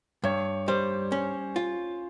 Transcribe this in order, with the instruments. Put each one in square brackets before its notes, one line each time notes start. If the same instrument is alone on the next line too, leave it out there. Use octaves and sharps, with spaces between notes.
[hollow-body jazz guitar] G2 [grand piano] C#5
[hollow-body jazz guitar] G3 [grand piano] C5
[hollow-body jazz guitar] C#4
F4